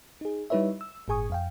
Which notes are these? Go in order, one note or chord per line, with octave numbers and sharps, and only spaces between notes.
D#4 G#4
G3 D#4 E4 B4 C#5 E5
E6
G1 A2 G#4 G#5 C#6 D#6
F2 F5 G5